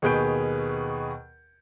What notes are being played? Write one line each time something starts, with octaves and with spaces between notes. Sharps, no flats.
D#2 B2 G#4 B4 G6 D7